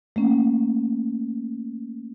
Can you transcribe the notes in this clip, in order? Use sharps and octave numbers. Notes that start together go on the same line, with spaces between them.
A3 A#3 C#4